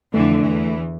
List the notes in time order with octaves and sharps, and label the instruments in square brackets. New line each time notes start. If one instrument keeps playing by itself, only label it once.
[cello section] F2 D3 E3 [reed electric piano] A3
[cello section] E2 E3